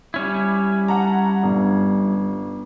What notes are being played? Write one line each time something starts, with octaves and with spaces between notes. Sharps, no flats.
G3 C#4 E4
F#5 A5 A#5
G1